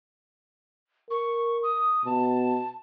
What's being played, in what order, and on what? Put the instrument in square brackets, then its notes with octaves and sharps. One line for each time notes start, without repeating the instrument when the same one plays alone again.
[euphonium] A#4 [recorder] C#6
[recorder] D#6
[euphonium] B2 [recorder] A5